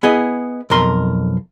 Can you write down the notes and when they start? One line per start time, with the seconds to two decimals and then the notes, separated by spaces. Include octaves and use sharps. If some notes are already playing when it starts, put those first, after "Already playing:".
0.03 B3 E4 G#4 D#5
0.70 B1 F2 A#4 C6